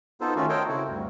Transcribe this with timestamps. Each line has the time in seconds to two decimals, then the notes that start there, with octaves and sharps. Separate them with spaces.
0.21 B3 D#4 F4 A4 C5
0.36 D#3 A3 C#4 F4 F#4
0.49 A4 A#4 C5 C#5 D#5 G5
0.69 C#3 C4 E4 F#4
0.88 D2 G2